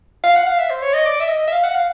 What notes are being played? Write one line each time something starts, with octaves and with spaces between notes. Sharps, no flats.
F5
F#5
F5
E5
C5
C#5
D#5
D5
E5
D#5
E5
F5
F#5
F5